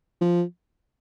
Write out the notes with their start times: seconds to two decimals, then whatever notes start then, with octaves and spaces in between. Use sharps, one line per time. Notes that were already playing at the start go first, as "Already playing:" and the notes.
0.21 F3